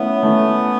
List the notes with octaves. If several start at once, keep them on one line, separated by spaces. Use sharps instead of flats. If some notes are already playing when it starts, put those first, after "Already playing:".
Already playing: A3 B3 C#4 E4
A3